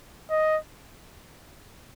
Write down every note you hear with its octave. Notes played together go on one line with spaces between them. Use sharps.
D#5